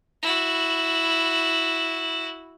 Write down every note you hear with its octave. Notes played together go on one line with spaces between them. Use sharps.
E4 F#4